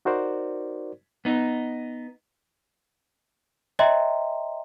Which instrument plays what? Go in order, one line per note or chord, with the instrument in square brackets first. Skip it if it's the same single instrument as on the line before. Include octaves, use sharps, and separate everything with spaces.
[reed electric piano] D#4 F#4 A#4 C5 D5
[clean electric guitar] B3 D#4
[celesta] C#5 D#5 E5 G5 A#5 C6